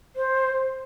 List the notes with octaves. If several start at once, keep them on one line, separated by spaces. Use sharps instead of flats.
C5